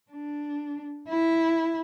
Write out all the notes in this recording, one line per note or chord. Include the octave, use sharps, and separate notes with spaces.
D4
E4